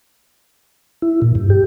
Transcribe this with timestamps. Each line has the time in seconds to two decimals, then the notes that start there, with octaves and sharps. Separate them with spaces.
1.02 E4
1.22 A#2
1.35 G2
1.50 G4